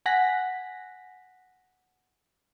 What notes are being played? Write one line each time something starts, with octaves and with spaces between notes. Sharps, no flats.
F#5 G#5 F#6 A#6 B6